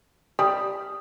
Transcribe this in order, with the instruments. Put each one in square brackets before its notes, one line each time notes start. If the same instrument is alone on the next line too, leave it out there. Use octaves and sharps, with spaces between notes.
[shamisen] G3 [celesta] D#6